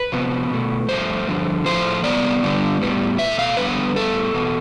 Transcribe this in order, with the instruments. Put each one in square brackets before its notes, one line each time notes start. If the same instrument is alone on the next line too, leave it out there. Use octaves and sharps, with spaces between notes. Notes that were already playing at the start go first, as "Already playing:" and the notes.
Already playing: [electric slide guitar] B4
C3 F3 B3
B2 A3
G2 F3 A3 C5
G2 D3 F3
A2 F3 A3 C5
C3 G3 B3 D5
G2 D3 G3 B3
A2 G3 B3
B2 A3 E5
F5
F2 D3 G3 B3 B4
A2 G3 B3 A4
E2 B2 B3